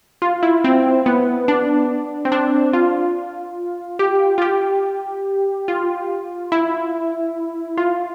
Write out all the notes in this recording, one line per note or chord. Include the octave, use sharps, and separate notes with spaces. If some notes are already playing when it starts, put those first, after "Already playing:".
F4
E4
C4
B3
D4
C4
D4
F4
G4
F4
G4
F4
E4
F4